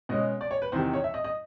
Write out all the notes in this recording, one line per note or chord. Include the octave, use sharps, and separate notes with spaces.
B2 G#3 C#4 D#5
D5
C#5
B4
E2 C3 D#3 C5
C#5
E5
D#5
D#5